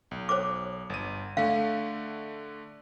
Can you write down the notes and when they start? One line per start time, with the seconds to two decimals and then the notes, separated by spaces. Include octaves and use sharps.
0.11 B1
0.29 C5 C#5 D6
0.90 G1 D#7
1.37 D3 A3 F5